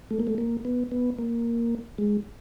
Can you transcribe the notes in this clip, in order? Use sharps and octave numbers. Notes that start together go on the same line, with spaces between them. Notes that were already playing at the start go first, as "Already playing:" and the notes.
A3
A#3
A3
A#3
B3
B3
A#3
G#3